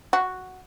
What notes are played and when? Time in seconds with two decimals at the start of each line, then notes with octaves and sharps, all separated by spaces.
0.13 F#4